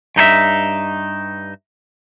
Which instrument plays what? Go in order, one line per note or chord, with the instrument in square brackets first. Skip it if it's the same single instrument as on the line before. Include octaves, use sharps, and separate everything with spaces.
[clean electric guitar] G2 D#4 G#4 E5